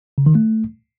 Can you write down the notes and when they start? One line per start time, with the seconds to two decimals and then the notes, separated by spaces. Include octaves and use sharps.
0.18 C#3
0.26 D#3
0.35 A3